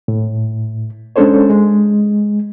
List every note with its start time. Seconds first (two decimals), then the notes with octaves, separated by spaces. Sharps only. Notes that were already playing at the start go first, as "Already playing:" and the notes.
0.08 A2
1.16 G#3 C#4 D4 A4 C5 C#5
1.49 G#3